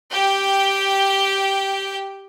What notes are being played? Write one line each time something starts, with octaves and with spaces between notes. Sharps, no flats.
G4 G5